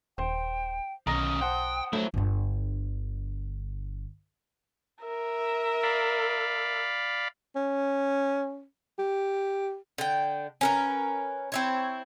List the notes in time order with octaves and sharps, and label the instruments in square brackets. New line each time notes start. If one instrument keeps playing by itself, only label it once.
[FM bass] D#1 [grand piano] C5 [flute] G5
[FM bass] B1 [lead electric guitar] D#3 C#4 [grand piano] A#5 A#6 [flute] D#6
[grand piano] C5 F#5 A5 [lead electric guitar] G5
[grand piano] F#3 [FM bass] A3 [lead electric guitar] E4 C5
[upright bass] G1 D3
[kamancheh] A#4 E5
[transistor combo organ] D5 F5 B5
[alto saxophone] C#4
G4
[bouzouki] D3 G5
C#4 A#4 B4
C4 E4 C#5